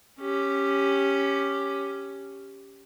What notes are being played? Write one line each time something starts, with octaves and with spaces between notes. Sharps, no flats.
C#4 G4